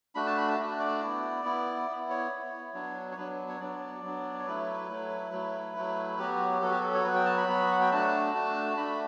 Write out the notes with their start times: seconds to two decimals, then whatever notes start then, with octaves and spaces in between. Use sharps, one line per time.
0.15 A3 D4 F#4 B5
0.26 A5
0.37 B5
0.48 A5
0.59 A3 D4 F#4
0.80 D5
1.02 B3 E4
1.44 B3 E4
1.88 B3 E4
2.10 C#5
2.31 B3 E4
2.74 F#3 B3 D4
3.12 C#5
3.17 F#3 B3 D4 B4
3.49 C#5
3.60 F#3 B3 D4 D5
4.03 F#3 B3 D4
4.39 C#5
4.46 F#3 A3 E4 B4
4.90 F#3 A3 E4
5.32 F#3 A3 E4
5.76 F#3 A3 E4
6.18 F#3 B3 F#4 G4
6.62 F#3 B3 F#4 A4
6.70 G4
6.80 A4
6.94 C#5
7.04 F#3 B3 F#4 B4
7.15 G5
7.25 A5
7.37 B5
7.48 F#3 B3 F#4
7.71 F#5
7.81 G5
7.91 A3 D4 F#4 A5
8.34 A3 D4 F#4
8.77 A3 D4 F#4 B5